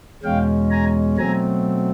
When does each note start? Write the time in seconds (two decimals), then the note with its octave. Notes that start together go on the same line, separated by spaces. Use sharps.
0.23 E2 B2 G#3 C#4 F5 G5
0.70 G#5 A#5
1.17 B2 F#3 A3 C4 G#5 A#5